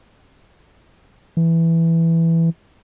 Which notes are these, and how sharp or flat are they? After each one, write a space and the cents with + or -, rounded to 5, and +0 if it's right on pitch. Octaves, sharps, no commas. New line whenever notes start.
E3 +5